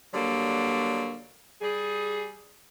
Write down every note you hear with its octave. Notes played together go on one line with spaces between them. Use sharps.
D3 F#3 G3 A#3
G3 G#4